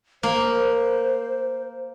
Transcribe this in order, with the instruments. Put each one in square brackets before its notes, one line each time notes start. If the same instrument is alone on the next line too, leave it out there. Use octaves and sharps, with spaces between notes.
[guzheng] A#3 [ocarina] C5